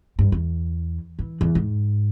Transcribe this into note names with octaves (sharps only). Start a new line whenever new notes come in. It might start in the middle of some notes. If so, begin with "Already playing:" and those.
G2
E2
E3
E2
G#2